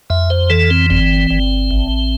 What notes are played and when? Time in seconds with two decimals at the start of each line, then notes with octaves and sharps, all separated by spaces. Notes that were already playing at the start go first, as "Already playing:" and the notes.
0.10 F2 E5
0.30 C5
0.50 E3 A4
0.70 C4
0.90 G1 C4
1.30 G1
1.71 A1